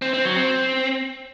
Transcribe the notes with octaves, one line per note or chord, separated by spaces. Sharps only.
C4
C4
F#3
C4